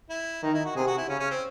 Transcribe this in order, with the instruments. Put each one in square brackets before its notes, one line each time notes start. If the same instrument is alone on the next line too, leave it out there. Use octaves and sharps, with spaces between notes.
[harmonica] E4
[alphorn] D#3 [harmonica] D#4
[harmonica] E4
F#4
[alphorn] C3 [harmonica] G#4
[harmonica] F#4
E4
[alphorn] C#3 [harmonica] C#4
[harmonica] C#4
C4